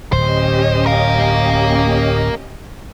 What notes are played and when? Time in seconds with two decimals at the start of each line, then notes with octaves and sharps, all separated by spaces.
0.13 D1 C#4 G4 C5 D#5
0.86 A#4 F5